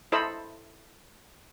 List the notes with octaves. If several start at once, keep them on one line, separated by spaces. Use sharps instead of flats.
E4 A4 C5 D#5 B5 E6